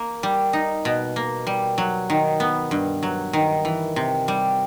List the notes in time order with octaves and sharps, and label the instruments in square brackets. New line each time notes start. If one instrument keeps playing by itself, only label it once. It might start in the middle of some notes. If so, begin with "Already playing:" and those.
Already playing: [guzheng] A#3
G3
D#4
B2
A#3
G3
F#3
D#3
B3
G2
F#3
D#3
E3
C3
G3